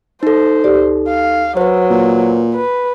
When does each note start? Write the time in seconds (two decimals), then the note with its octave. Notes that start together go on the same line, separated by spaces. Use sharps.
0.23 D#4 A4 C5
0.64 D2 G4 D5
1.08 F5
1.57 F#3 B4 C5
1.90 A#2
2.54 B4